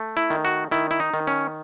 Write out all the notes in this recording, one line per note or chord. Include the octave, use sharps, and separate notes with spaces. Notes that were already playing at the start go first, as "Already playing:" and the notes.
Already playing: A3
E4
D#3
F#4
D#3 E4
E4
D#4
D#3
C#4